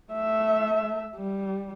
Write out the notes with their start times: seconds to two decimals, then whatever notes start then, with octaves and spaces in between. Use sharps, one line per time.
0.13 A3 E5
1.16 G3